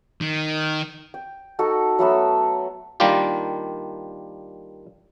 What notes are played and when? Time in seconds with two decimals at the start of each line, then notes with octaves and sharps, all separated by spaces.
0.21 D#3
1.14 G5
1.59 D#4 F#4 A4
1.99 F#3 A3 B3 E6
3.00 D#3 G3 A#3 D4 F4 G4